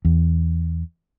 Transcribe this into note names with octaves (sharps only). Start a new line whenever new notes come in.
E2